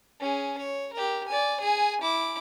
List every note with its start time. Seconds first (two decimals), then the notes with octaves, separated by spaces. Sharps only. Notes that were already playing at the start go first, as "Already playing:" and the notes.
0.20 C#4 G#4
0.58 C#5
0.93 G4 A#4
1.28 D5 G#5
1.61 G#4 G#5
2.02 E4 D6